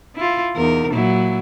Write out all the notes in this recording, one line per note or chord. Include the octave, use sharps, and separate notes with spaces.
E4 F4
E2 D#4 A#4
A#2 F#3 E4